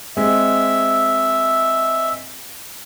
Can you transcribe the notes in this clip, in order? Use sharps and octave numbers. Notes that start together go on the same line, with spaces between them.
G#3 C4 E5